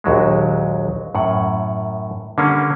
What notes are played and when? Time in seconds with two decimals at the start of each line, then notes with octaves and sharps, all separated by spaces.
0.04 A#1 D#2 F#3 G#3
1.15 F#2 A2 F#5
2.38 D3 G3 A#3 C#4